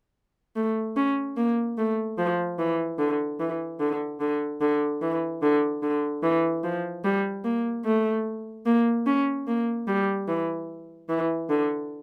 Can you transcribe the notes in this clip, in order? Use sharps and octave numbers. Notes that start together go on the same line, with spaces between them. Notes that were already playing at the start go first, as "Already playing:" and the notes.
A3
C#4
A#3
A3
F3
E3
D3
E3
D3
D3
D3
E3
D3
D3
E3
F3
G3
A#3
A3
A#3
C#4
A#3
G3
E3
E3
D3